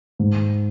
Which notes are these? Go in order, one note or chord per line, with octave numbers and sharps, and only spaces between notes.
G#2